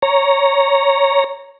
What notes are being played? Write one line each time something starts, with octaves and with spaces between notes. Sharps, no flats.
C#5 A#5